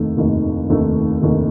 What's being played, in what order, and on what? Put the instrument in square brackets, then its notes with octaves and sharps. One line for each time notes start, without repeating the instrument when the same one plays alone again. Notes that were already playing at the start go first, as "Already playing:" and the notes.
Already playing: [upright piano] F1 D#2 D#3 A3
F1 D#2 D#3 A3
F1 D#2 D#3 A3
F1 D#2 D#3 A3